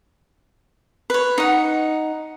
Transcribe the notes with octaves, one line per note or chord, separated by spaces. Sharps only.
B4 C#5
D#4 F#5